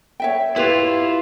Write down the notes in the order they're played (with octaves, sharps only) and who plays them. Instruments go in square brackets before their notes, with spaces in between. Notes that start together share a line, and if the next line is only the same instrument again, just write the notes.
[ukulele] C#5 E5 G5
[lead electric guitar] E4 F4 [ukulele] G4 B4 C#5